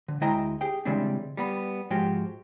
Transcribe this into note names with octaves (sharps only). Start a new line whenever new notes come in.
D3
D2 G#3 E4 D#5 G5 A#5
G4 G#4 G5
C#3 E3 G3 G#3 C4 D4
G3 B3 B5
G#2 F3 G#3 F#4 G4